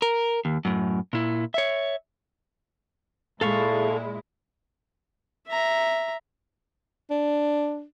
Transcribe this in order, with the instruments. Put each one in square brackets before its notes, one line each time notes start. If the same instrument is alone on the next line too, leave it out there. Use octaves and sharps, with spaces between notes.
[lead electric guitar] A#4
D#2
F#2 A2
A#2 E4
C#5 E5
[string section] A#2 G#3 E4 [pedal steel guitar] A4 F5 C#6
[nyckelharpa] E5 A#5
[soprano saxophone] D4